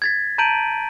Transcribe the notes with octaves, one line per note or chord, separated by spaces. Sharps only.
G#6 A6 B6
A5 A#5 G6 D7 D#7 F#7